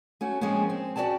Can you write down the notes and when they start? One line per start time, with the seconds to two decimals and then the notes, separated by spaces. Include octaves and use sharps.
0.21 A3 C#4 F#4
0.41 F3 G#3 A#3 C4 C#4
0.69 C4
0.96 C#4 F#4 A#4 D5 G5 A5